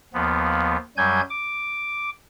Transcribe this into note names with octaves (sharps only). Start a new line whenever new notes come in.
D#2 F3 B3
F#2 F#3 G3 G#5 G6 G#6
D6